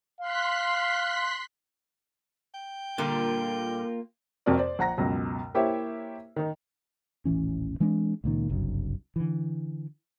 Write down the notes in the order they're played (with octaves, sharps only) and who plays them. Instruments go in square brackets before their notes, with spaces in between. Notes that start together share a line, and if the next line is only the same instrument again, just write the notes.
[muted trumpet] F5 [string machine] C6 F#6 B6
[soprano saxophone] G5
[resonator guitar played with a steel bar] A#2 D3 G3 [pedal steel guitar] A#3 F4 A#4
[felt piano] F2 C3 C4 F#4 A#4 D5
C5 D5
A#1 F#5 A#5 A#6
C#2 F#2 B2
A#3 E4 G4 C5 C#5 E5
D#3 D#4
[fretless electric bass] D#1 A1 E3 C#4
E3 G#3 C4 D4
C#2 A#2 D#3
F#1 C2 G2 F#3
D3 E3